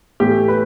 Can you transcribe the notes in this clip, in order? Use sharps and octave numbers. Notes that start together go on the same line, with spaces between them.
A2 E3 A3 G4
B4